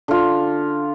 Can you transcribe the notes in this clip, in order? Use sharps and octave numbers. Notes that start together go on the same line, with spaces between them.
D3 F4